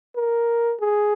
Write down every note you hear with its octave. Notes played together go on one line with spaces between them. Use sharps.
A#4
G#4